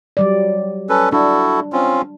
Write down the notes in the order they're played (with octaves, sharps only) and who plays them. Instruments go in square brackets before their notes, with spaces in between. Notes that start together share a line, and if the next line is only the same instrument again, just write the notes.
[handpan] F#3 G3 D5
[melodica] C#4 A4 B4
[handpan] D4 [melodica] E4 F#4 A4
[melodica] C4 C#4 F4